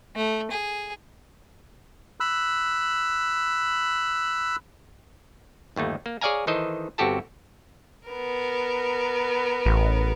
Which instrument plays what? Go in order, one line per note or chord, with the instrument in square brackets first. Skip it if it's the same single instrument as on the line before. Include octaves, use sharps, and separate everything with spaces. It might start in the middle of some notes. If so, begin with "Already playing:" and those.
[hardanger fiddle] A3
G#4
[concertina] B5 E6 F#6
[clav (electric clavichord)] G1 D#2 A3 D#4
A#3
G#4 C#5 D5 F5 G#5 A#5
D#3 E3 D#4 A4 C5 D#5
G1 C4 F#4 G4 A4 A5
[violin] B3 A#4
[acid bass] A1